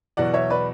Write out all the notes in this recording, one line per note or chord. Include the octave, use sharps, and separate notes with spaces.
E2 B2 F#3 D5 F#5
C#5 E5
B4 D5